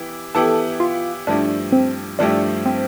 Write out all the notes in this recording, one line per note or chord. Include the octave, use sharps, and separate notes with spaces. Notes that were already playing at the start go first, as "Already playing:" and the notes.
Already playing: E3 B3 E4 G4
E3 B3 E4 G4 A4
F4
G2 F3 A3 D4 E4 G4
C4
G2 F3 A3 D4 E4 G4
C4